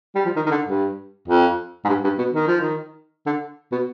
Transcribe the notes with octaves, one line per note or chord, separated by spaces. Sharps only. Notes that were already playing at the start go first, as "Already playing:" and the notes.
G3
F3
D#3
D#3
D3
G2
F2
G#2
G2
G2
B2
D#3
F3
D#3
D3
B2